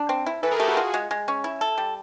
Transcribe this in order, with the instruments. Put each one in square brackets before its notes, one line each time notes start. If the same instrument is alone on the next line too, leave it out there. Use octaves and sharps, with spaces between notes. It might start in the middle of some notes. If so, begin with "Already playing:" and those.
Already playing: [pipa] D4
C4
E4
[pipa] E3 [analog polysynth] A4 B4
[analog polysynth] G#4 A#4
[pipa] A3 [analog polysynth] G4 A4
[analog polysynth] F#4 G#4
[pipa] F4
G#3
G#3
C#4
E4
A4
G3